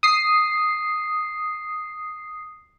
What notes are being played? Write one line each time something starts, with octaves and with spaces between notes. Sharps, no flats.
D#6 C7